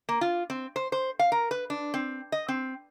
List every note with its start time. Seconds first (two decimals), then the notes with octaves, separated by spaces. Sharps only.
0.09 A#3
0.21 F4
0.50 C4
0.76 C5
0.92 C5
1.19 F5
1.32 A#4
1.51 B4
1.70 D4
1.94 C4
2.32 D#5
2.48 C4